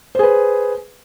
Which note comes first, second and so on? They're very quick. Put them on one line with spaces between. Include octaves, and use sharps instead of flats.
C5 G#4 B4